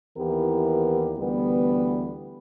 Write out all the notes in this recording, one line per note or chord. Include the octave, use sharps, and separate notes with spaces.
D#2 E3 B3 E4 G4 A#4
D2 E3 G3 B3